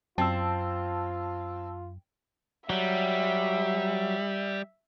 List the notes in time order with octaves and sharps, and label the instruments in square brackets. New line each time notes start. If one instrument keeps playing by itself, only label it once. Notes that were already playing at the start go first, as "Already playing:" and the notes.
[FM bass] F#2 [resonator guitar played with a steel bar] C4 [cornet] F4 [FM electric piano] A5 E6
[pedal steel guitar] F#3 [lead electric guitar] G3 [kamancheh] E5